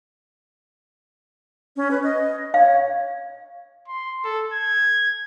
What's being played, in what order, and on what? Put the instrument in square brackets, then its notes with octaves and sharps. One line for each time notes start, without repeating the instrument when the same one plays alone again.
[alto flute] C#4
B4
D#5
[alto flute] C#5 [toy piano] F5
[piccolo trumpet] C6
A4
G#6